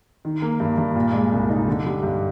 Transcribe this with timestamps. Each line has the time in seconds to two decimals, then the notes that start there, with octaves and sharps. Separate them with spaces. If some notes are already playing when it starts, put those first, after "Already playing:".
0.25 D#3
0.42 A#3
0.60 G2
0.78 G2
0.96 A#2
1.13 G#3
1.32 C2
1.49 D#4
1.68 D3
1.86 G3
2.03 G2